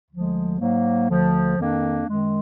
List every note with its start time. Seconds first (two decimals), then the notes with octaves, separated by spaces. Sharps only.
0.11 D2 D3 F3 G#3
0.60 G#2 F#3 A#3
1.09 D2 D3 F3
1.57 F2 D#3 A#3 D4
2.06 F#2 D#3 G#3